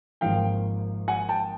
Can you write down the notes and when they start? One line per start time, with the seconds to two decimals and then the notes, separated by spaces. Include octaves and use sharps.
0.21 G#1 G#2 F3 A#3 F5 G5
1.08 F#5 G#5
1.29 G5 A5